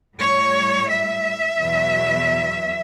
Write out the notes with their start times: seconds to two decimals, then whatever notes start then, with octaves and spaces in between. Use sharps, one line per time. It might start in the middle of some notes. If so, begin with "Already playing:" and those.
0.17 A2 G3 C#5
0.88 E5
1.57 E2 B2 F#3